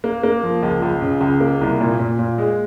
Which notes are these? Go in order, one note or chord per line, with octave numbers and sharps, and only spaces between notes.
A#3
A#3
F3
C#2
C#2
C#3
C#2
A#3
C2
A#2
A#2
A#2
G#3